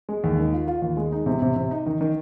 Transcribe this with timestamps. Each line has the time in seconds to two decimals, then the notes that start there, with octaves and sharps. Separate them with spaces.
0.09 G#3
0.24 D#2
0.39 D#3
0.53 F4
0.68 F4
0.82 D#2
0.97 G#3
1.12 D#4
1.26 C3
1.42 C3
1.56 C3
1.71 D#4
1.86 D#3
2.01 D#3